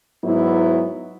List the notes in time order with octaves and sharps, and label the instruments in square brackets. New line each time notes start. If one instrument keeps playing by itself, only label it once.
[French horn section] G#2 F#3 B3 E4